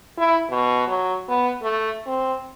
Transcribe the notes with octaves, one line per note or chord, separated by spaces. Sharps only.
E4
B2
F#3
B3
A3
C4